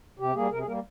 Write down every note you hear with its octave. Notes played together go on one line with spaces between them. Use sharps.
C3 G4
G3 A#3 G#4
C3 A#4
G#4
G3 A#3 A#4